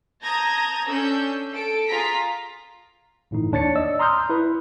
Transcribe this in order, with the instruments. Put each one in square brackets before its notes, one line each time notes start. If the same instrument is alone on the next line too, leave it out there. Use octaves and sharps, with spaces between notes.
[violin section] A5 A#5 D#6 G6 G#6 A#6
C#4 D4 A4 E6 G6
A4 D7
F4 G#4 A#5 B6
[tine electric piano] G1 A2 E3 D#4
D#2 D4 C#5 A6 C#7
D5 D#5 E6
A#5 C6 D#6 F6 G6
E4 B4